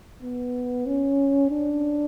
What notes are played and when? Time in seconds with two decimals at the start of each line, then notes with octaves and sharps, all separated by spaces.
0.23 B3
0.87 C#4
1.51 D4